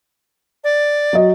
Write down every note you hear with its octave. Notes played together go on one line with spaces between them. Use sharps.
D5
F#3 D#5